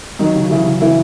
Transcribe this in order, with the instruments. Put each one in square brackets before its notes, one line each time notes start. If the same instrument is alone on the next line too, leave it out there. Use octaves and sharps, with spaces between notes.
[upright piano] D#3 D#4 [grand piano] F#3
[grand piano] C#3
[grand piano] C#3 [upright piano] E3 E4
[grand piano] C#3
[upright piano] E3 E4 [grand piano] F#3